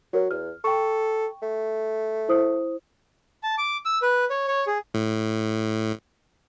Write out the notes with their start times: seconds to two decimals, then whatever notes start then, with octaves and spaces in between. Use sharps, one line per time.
0.13 F#3 F#4 A#4 C#5
0.31 E2 F6
0.64 A4 G5 C#6
1.42 A3
2.28 E4 C5 D#6
3.43 A5
3.58 D6
3.85 E6
4.02 B4
4.30 C#5
4.48 C#5
4.67 G#4
4.94 A2